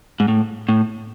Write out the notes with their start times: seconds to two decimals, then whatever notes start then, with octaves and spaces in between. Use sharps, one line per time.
0.20 G#2
0.28 A2
0.69 A2